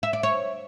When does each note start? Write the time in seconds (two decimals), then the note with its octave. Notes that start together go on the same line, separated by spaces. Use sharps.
0.03 E5
0.13 D5
0.23 C#5